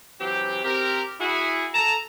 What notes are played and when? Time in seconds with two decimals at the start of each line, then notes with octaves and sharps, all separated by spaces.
0.21 E3 F#3 C4 G4
0.65 C4 G4 A#4
1.20 E4 F#4 G#4
1.74 A4 A5 A#5